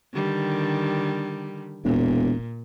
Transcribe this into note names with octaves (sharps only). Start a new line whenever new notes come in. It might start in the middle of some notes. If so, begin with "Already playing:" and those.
D3 D#3 G3
E1 A#2